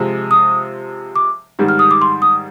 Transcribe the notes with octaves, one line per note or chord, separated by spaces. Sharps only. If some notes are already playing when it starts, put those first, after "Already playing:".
Already playing: C3 F3 G#3
D#6
D6
G#2 D#3 G3
F6
D#6
D6
C6
D#6